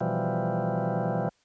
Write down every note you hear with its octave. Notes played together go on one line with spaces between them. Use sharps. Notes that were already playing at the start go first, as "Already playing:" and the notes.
B2 E3 F3 G3